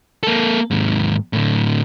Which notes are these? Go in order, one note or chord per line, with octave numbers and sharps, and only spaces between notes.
A#3 A4
D#2 G#2
A2 D3